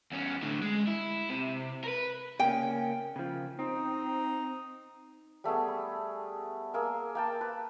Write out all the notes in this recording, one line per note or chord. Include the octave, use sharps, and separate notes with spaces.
E2 C#4
A2 D3
G#3
E4
C3
A#4 B4
C#3 A#3 C#4 G5
C#3 F3
C4 D#4
G3 A3 B3 G#4
B5
A#3 G#4 A#4 E6
A#3 G5 A5
B4